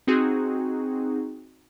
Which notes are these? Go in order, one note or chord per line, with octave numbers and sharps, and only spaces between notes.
C4 D#4 F#4 G#4